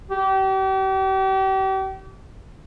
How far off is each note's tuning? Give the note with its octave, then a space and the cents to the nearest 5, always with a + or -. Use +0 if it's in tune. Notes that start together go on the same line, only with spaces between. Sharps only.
G4 -35